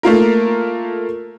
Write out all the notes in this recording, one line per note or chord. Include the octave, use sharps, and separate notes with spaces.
A3 A#3 F4 A#4